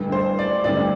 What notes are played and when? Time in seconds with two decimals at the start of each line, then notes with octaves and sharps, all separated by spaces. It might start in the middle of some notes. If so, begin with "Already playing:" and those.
Already playing: A1 G2 D3
0.12 C5
0.39 D5
0.64 A1 G2 D3 D5